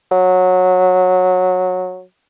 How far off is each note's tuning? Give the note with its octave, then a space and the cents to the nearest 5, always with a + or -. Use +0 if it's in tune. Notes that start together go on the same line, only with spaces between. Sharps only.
F#3 -15